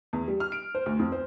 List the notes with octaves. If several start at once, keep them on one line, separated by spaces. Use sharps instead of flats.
E2
G3
F6
D7
C5
D2
F2
C5